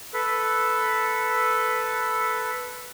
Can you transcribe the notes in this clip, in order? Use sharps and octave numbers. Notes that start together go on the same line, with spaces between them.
A4 B4